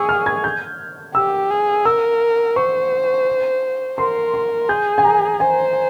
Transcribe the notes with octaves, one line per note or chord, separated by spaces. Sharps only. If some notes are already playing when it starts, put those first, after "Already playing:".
Already playing: G#4 C#6 E6
F6
G#6
G6
G4 E6
G#4
A#4 E6
C5 C#6
A#4 C6
C6
G#4 G6
G#5
A#5
C5 G#5